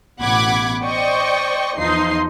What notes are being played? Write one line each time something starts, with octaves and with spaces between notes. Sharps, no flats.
A1 B2 F#5 B5 D6 G#6
C5 D5 D#5 G5 C#6
E2 F3 D#4 C6 C7